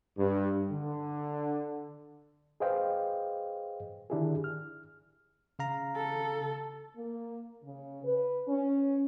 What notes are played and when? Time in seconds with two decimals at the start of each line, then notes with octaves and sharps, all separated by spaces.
0.18 G2
0.71 D3
2.60 G#4 B4 C5 D#5 F5 G5
4.10 D3 D#3 D4 E4 G4 G#4
4.44 F6
5.59 C#3 F5 A#5
5.96 A4
6.97 A#3
7.64 C#3
8.03 B4
8.48 C#4